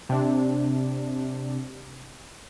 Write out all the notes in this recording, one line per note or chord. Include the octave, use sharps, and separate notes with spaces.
C3 D4